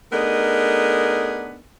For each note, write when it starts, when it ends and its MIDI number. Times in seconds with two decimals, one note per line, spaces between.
0.12 1.59 57
0.12 1.59 59
0.12 1.59 62
0.12 1.59 63
0.12 1.59 68
0.12 1.59 70